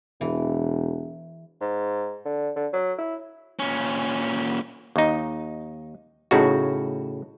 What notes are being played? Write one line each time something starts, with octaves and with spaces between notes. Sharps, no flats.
E1 E3
G#2
D3
D3
F#3
E4
A#2 C#4
D#2 D#4
A2 C#3 D#4 F#4